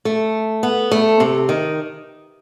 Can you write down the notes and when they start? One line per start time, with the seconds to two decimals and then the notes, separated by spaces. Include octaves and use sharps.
0.05 A3
0.63 B3
0.91 A3
1.20 C3
1.49 D#3